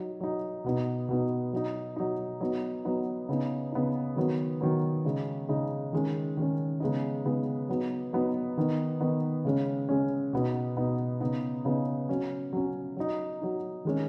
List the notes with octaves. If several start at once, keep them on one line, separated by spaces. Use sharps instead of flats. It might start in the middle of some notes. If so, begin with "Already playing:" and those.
Already playing: F#3 D#4
F#3 D#4
B2 B3 D#4
B2 B3 D#4
F#3 D#4
F#3 D#4
F#3 B3 D#4
F#3 B3 D#4
C#3 B3 D#4
C#3 B3 D#4
D#3 F#3 B3
D#3 F#3 B3
C#3 G#3 D#4
C#3 G#3 D#4
D#3 G#3 C#4
D#3 G#3 C#4
C#3 G#3 B3 D#4
C#3 G#3 B3 D#4
F#3 B3 D#4
F#3 B3 D#4
D#3 B3 D#4
D#3 B3 D#4
C#3 G#3 C#4
C#3 G#3 C#4
B2 B3 D#4
B2 B3 D#4
C#3 B3 D#4
C#3 B3 D#4
F#3 C#4
F#3 C#4
F#3 D#4
F#3 D#4
D#3 G#3 C#4